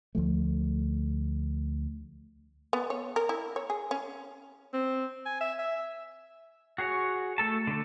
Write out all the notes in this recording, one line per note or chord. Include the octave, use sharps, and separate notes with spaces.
D2 F3 A3
B3
C#5
A#4
E4
C#5
G#4
C#4
C4
G#5
E5
E5
F#4 G#4 C#5
A3 A4 A5
D3 A3